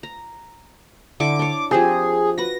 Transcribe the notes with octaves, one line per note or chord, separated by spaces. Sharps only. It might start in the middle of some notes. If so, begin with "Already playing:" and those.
A#5
D3 E4 C#6 D6
D4 C#5
F3 C4 G4 G#4
F#4 B4 A#6